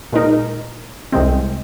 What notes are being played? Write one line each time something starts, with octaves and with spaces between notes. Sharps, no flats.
A#2 G#3 D#4 A#4
C2 C3 G#3 C4